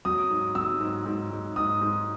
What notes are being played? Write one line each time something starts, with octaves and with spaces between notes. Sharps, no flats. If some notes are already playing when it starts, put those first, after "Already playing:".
F#3 D#6
G#2
F#3 E6
G#2
G#2
G#2
G#2 D#6
G#2